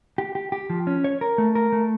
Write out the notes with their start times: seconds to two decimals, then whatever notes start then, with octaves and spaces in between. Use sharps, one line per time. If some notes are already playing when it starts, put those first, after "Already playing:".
0.18 G4
0.35 G4
0.52 G4
0.70 F3
0.87 C#4
1.04 C#5
1.21 A#4
1.38 A3
1.55 A#4
1.72 A3